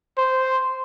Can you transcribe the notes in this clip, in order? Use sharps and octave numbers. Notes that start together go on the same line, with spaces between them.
C5